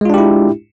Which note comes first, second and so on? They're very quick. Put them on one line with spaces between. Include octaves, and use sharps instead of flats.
G#3 F4 D4 G4 E4